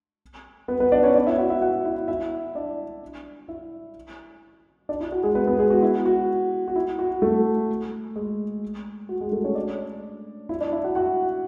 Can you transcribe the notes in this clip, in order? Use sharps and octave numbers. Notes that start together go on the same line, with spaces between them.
B3 B4
B3 B4
D4 D5
C#4 C#5
D4 D5
E4 E5
F#4 F#5
E4 E5
F#4 F#5
E4 E5
E4 E5
D4 D5
E4 E5
D4 D5
E4
F#4
G#3 G#4
B3 B4
B3 B4
G#3 G#4
F#4
E4
F#4
F#4
E4
F#4
A3 A4
G#3 G#4
F#4
G#3 G#4
A3 A4
C#4 C#5
D4 D5
E4 E5
D4 D5
E4 E5
F#4 F#5
F#4 F#5